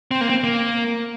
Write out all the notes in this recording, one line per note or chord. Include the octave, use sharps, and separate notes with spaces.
C4
A#3
C4
A#3